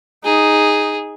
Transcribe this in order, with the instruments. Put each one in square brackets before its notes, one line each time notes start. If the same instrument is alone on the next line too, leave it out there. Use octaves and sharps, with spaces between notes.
[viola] D#4 [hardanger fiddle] G#4